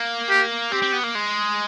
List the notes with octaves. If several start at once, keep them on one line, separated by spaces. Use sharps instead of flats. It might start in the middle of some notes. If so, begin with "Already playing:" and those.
Already playing: A#3
G4
C4 G4
C4
B3
A#3
G#3